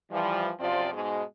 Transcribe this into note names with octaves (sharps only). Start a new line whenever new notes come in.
E3 F3 G3
F#2 C3 F3 C4 F4 D5
G#2 B2 G#3